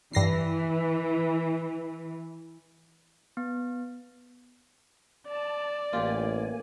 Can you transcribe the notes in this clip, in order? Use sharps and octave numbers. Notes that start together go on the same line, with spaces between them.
G2 E3 A#6 C7
B3
D5 A5
A1 A#3 F4 G4 G#5